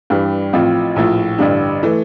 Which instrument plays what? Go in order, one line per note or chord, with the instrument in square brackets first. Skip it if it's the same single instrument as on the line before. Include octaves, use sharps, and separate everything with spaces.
[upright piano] G2 E3 G3
A1 A2 F3 C4 F4
A#1 A2 F3
A1 G2 D3 G3 D4
E3 A3